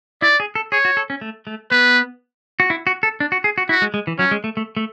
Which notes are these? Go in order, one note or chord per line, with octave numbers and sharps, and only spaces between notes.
E4 D5
G#4
A4
G#4 C#5
F#4
A4
C#4
A3
A3
B3 B4
F#4
E4
F#4
A4
D4
F#4
G#4
F#4
E4 F#4
G#3
G#3
E3
F#3 C#4
G#3
A3
A3
A3